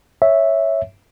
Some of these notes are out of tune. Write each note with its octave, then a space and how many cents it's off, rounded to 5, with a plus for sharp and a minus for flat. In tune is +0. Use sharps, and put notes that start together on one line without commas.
C#5 -5 E5 -5